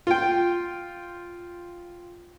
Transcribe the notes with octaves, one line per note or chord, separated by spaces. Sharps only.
F4 G5